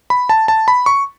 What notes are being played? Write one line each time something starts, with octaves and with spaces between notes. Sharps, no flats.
B5
A5
A5
B5
C#6